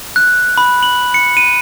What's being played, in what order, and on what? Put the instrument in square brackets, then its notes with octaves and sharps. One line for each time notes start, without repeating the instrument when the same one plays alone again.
[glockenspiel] F#6
B5
F#7
C#7
D#7